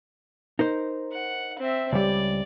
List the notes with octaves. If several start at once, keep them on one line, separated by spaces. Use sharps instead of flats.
D#4 A#4 C5
F#5
C4 E5
C#2 G3 D5